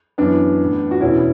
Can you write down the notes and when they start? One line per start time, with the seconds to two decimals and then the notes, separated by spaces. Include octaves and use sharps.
0.18 F#2 E3 B3 D4
0.59 A2 E3
0.91 F#4
1.01 E2 B2 C#4 E4